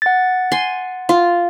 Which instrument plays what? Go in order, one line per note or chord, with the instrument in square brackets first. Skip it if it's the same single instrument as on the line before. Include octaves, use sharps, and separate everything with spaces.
[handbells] F#5 A6
[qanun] G#5 C6
F4